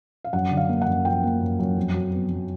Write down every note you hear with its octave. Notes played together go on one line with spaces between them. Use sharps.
F5
F#2 F#5
D3
F5
A#3
F#5
F#2
F3 G5
A#3
F#2
F#2
F2
F#3
B3
F#3